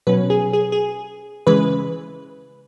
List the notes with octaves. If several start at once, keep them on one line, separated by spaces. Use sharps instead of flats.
B2 F#3 C#4 B4
G#4
G#4
G#4
C#3 E3 G#3 B4